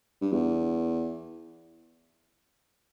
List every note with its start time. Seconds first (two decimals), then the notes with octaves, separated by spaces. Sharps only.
0.21 G2
0.33 E2